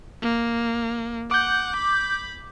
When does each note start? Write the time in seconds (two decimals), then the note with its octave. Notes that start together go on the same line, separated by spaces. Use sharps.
0.22 A#3
1.31 F#5 D6 G6
1.77 B5